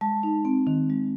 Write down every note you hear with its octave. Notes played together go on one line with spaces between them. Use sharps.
G#3 A5
D#4
C4
D#3
G#3